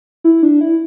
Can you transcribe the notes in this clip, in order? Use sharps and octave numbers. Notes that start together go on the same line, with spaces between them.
E4
D4
E4